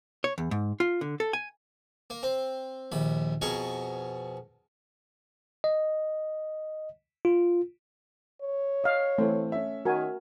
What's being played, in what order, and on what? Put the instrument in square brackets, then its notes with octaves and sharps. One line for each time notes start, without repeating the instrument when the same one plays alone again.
[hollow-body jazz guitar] C#5
E2
G#2
F4
D3
A4
G#5
[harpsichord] A#3
C4
A#1 D#2 B5
F2 B2 G#4 A#4 C#6
[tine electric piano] D#5
F4
[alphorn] C#5
[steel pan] D#5 F5
[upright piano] E3 C4 [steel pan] A3
[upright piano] C#4 E5
[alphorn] D#3 [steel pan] F#4 A#4 G#5